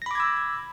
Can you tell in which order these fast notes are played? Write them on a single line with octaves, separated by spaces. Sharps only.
A#6 B5 D6 G#6 E6